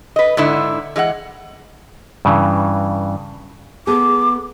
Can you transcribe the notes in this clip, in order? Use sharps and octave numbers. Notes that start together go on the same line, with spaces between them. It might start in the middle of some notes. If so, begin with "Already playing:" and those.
B4 D#5
G#2 D3 E4
E3 G#3 E5 F#5
G2 C#3 E3
B3 G#4 A4 D6